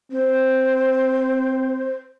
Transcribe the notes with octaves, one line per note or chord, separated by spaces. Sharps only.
C4 C5